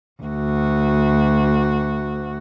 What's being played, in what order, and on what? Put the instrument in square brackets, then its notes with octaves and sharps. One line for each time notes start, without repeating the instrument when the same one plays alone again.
[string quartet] D2 F#4